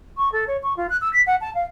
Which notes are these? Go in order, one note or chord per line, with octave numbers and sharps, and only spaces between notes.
C#6
A4
C#5
C#6
F4
F#6
E6
B6
F#5
A5
F5